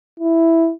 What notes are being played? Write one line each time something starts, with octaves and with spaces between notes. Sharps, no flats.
E4